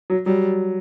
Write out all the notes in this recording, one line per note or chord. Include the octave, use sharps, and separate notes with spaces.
F#3
F#3 G3